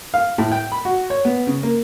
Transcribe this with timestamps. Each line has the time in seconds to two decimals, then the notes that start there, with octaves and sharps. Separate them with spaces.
0.14 F5
0.38 A2
0.52 G5
0.72 B5
0.85 F#4
1.10 C#5
1.25 B3
1.47 C#3
1.63 A#3